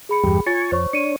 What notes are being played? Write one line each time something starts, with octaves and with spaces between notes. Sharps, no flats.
G#4 B5 C#7
E2 G2 G4
F4 C#5 G#5 C#6 A6
F2 C5 C#5 C#6
D4 C#5 C#7 D#7